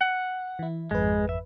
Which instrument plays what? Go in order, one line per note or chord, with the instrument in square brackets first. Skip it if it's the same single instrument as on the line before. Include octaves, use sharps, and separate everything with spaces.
[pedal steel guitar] F#5
[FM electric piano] E3 E4
[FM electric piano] G#1 F2 B4 [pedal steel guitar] G#3
[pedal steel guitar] E5